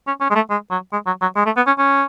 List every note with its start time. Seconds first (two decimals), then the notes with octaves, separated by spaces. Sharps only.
0.07 C#4
0.20 C#4
0.30 G#3
0.35 A3
0.50 G#3
0.71 F#3
0.93 G#3
1.06 F#3
1.21 F#3
1.36 G#3
1.46 A3
1.56 B3
1.67 C#4
1.78 C#4